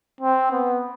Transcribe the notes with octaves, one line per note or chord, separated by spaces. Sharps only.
C4
B3